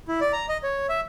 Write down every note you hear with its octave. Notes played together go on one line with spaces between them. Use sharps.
E4
D5
A#5
D#5
C#5
E5